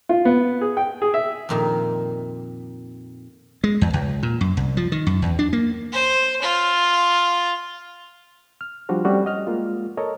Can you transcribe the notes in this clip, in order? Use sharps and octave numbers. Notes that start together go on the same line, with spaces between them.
F4
B3
G#4
G5
G#4
E5
F2 A#2 D#3
G#3
E2
C#2
A#2
F#2
C2
F3
D#3
F#2
E2
D4
A#3
C5
F4
F6
F3 G3 D4 F#4 C5
G3 A3 C4 C#4 F#4 G4
D#5 F6
G#3 A#3 F4
A4 A#4 C#5 D#5